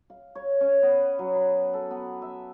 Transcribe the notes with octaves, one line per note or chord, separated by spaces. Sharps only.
F5
C#5
C#4
B3
F#3
B5
A4
B3
E5